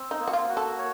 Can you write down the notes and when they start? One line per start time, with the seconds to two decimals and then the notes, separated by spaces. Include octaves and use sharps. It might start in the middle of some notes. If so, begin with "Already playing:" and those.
Already playing: C4
0.11 D#4
0.20 A#3
0.28 F#4
0.33 F4
0.49 F#4
0.57 A4
0.78 C#5